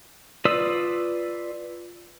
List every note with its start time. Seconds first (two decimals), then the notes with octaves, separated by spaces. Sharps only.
0.45 F4 B4 D5 D#6 E6